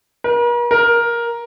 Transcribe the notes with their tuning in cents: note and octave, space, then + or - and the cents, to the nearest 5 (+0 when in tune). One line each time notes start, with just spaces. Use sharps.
A#4 +45
A#4 +10